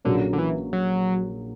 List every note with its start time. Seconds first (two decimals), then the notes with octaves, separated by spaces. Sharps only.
0.05 A#1 A#2 D3 F#3 A#3 C#4
0.33 D3
0.39 E3
0.73 F#3